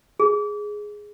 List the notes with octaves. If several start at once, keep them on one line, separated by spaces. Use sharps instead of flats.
G#4